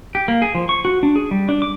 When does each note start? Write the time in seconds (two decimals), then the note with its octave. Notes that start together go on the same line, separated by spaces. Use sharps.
0.15 G4
0.28 A#3
0.42 G#4
0.55 F3
0.69 C#6
0.85 F#4
1.03 D4
1.16 G#4
1.31 G3
1.49 D4
1.62 D6